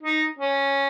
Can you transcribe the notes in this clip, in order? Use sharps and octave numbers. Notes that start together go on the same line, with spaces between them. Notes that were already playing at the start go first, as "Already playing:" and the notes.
D#4
C#4